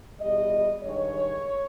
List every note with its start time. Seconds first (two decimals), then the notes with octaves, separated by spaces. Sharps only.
0.21 E2 B2 G3 D#5
0.83 G2 D#3 G#3 C#5